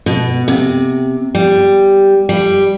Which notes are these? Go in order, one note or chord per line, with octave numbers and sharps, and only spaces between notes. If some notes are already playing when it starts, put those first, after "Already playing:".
B2
C3
G3
G3